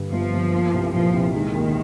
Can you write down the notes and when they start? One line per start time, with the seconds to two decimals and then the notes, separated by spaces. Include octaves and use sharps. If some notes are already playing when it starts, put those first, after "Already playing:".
Already playing: G2 D3
0.11 G1 F3
0.32 G1
0.53 A#3
0.74 C2
0.94 A#2 F3
1.13 C2
1.34 D#3 G#3
1.55 D#2